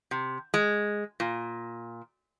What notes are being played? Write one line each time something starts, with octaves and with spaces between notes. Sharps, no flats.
C3
G#3
A#2